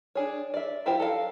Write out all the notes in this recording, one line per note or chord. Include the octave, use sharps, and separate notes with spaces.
D4 G#4 C#5
D5 E5
F#3 E4 F4 G4 C5
A4 A#4 D#5 F5